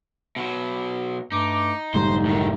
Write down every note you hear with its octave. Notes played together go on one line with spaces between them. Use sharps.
B2 F#3
G2 A3 D#4 D6
F1 G#2 D3 G3 A3 D#4 C5
A2 D#3